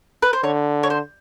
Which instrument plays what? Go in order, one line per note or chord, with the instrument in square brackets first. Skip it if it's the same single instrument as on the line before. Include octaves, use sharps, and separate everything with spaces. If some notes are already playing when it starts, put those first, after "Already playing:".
[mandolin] B4
C5
[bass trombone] D3 [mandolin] C#5
[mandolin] C#5
C5